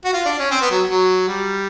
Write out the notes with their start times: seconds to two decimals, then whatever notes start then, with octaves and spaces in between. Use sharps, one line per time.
0.05 F#4
0.13 F4
0.25 D4
0.39 C#4
0.51 C4
0.61 B3
0.71 F#3
0.90 F#3
1.28 G3